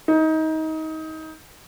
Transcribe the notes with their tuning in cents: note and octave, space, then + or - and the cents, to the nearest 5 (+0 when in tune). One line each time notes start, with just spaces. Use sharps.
D#4 +25